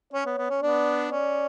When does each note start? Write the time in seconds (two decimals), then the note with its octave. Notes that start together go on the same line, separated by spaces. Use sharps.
0.13 C#4 C#5
0.26 B3
0.38 B3
0.50 C#4
0.62 B3 D4 D5
1.11 C#4 D5